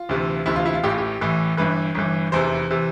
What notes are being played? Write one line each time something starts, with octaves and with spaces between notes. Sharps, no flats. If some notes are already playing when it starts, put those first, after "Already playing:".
Already playing: F4
D2 C3 E3
D2 C3 E3 E4
F4
E4
F4
A1 A2 E3 G4
F4
G4
A1 A2 E3
G1 G2 E3 B4
G1 G2 E3
F1 E2 C3 E3 C5
C3 E3